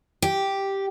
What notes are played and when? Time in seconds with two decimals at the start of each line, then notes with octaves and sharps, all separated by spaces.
0.22 G4